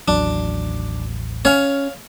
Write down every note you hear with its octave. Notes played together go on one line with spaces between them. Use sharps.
A1 D#2 F#3 D4
C#4 C#5 F5